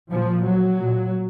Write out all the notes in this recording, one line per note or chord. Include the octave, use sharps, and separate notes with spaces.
A#2 F3
F#3
A#2